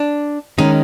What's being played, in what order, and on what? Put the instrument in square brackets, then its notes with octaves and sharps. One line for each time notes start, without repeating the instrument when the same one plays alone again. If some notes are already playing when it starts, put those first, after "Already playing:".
Already playing: [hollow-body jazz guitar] D4
[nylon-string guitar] D#3 G#3 C#4 [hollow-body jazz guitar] D#4